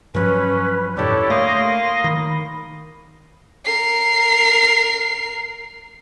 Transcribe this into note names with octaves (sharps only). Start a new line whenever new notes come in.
G2 F3 F#3 C#4 B4
F2 A2 D3 D4 E4 G4 A4 C#5
A3 A#3 C6 D#6 A#6
D#3 B5
A#4 C7